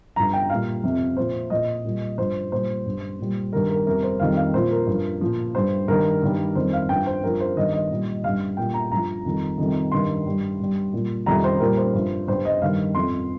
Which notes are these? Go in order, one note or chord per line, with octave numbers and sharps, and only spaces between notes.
G2 F3 A#5
G5
A#2 G3 F5
F2 C3 F3
A#2 F3 C5
A#2 F3 D#5
A#2 G3
G2 F3 C5
A#2 G3 C5
G2 G3
A#2 G3
G2 D#3 G3 A#4
A#4
F2 C3 G3 A#4
C5
F2 D#3 G3 F5
F5
A#2 F3 C5
A#4
G2
F3
A#2 F3
G2 G3 C5
G2 D#3 G3 A#4
G2 D#3 G3
F2 D#3 G3 C5
F5
G2 F3 G5
C5
G2 F3 A#4
C5
G2 D#3 G3 D#5
D#5
A#2 G3
G2 G3 F5
A#2 G3 G5
A#5
G2 F3 A#5
F2 D#3 G3
F2 C3 D#3 G3
G2 D#3 G3 C6
G2 G3
G2 G3
A#2 G3
F2 C3 D#3 G3 A#5
C5
A#2 G3 A#4
C5
G2 F3
G2 G3 C5
D#5
G2 D#3 G3 F5
F2 F3 C6